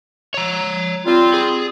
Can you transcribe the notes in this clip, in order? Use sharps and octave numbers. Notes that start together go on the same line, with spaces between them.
C#5 A#5
G3 C4 F4
G#4